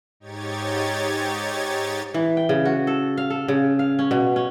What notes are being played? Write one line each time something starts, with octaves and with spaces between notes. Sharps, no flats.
G#2 D#4 G4 C#5 G#6 A6
E3
G5
C#3
F#4
A4
F5
A4
C#3
F5
C#4
B2
C#4